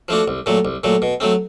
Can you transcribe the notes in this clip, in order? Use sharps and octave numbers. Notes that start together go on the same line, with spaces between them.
F3 A3 D4 F#4
C2
A#2 F#3 A3
C2
A#2 F#3 A3
B2
F#3 A3 C4